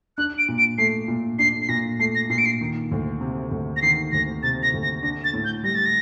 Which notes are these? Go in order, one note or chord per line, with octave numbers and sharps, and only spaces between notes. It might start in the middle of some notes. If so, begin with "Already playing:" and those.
D4 F#6
D7
A#2
D7
A3 C7
A#2
D4 C7
C7
A#2 A#6
A3 C7
A#6
A#2 C7
D7
C7
D#3
D2
C3
D2
A#6
D#3 C7
D2 A#6
C3 A6
A#6
D2
A#6
D4 A#6
A6
A2
G6
G3 A#6
A6
A#6